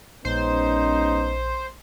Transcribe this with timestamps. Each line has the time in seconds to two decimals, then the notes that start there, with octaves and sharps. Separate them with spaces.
0.25 A#1 G#3 B3 C#4 D#4 C5